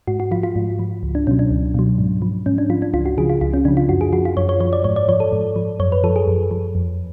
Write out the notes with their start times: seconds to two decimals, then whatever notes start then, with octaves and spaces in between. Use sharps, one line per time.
0.07 G#2 F#4
0.20 F#4
0.31 F3 F4
0.43 F4
0.56 G#2
0.79 F3
1.03 C#2
1.15 D4
1.27 B2 F#3 C#4
1.39 D4
1.51 C#2
1.74 B2 F#3
1.98 G#2
2.22 F3
2.46 G#2 C#4
2.58 D4
2.70 F3 F4
2.82 D4
2.93 C#2 F4
3.06 F#4
3.18 C#3 F3 G#4
3.29 F4
3.41 C#2 F4
3.54 C#4
3.65 C#3 F3 D4
3.77 F4
3.89 F#2 F#4
4.01 G#4
4.13 F3 F#4
4.25 F4
4.37 F#2 C#5
4.49 C#5
4.60 F3 C#5
4.73 D5
4.84 G#2 C#5
4.96 D5
5.08 F3 C#5
5.20 A4
5.32 G#2
5.56 F3
5.80 F#2 C#5
5.92 B4
6.04 F3 A4
6.16 G#4
6.27 F#2
6.51 F3
6.75 F2